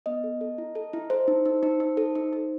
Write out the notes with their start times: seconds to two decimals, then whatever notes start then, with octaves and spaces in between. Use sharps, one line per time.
0.06 B3 D#5
0.24 A4
0.41 A4
0.58 E4
0.75 A4
0.93 E4
1.10 A4 C5
1.28 D#4
1.46 D#4
1.63 D#4
1.80 D#4
1.97 A4
2.15 D#4
2.33 D#4